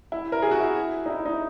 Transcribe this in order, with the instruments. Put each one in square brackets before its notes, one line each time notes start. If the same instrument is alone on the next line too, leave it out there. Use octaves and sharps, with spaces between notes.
[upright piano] E4
A#4
G#4
F#4
E4
D#4
E4
D#4